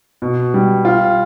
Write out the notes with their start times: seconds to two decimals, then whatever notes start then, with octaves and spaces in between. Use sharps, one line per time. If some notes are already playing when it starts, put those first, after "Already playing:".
0.22 B2
0.54 G3
0.85 F4